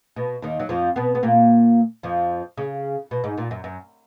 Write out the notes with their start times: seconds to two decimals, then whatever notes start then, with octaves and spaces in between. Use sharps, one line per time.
0.16 B2
0.42 D#2 D#3
0.60 F#3
0.69 F2 F3
0.96 B2 B3
1.15 B3
1.23 A#2 A#3
2.03 F2 F3
2.57 C#3
3.11 B2
3.24 G#2
3.38 A#2
3.51 F#2
3.64 F#2